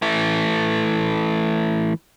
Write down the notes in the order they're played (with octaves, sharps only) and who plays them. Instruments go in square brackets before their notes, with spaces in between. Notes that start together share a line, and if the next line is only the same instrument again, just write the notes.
[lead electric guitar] E3 A3